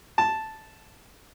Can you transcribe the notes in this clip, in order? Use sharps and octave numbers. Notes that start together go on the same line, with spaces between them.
A5